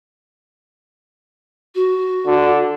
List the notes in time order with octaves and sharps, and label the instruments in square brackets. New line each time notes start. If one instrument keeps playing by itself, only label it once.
[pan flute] F#4
[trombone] D3